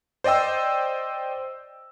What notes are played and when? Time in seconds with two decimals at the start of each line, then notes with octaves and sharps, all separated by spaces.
0.24 C5 D5 D#5 G5 E6